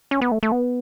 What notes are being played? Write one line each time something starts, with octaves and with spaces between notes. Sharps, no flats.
C#4
B3
A3
A3
B3